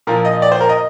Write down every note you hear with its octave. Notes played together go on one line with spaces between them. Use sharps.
A#2 F3 A#4
D#5
D5
C5
A#4
D#5